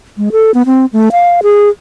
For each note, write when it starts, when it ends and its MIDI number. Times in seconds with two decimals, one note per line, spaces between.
0.18 0.29 56
0.32 0.51 69
0.54 0.62 59
0.66 0.86 60
0.93 1.09 57
1.12 1.40 77
1.43 1.69 68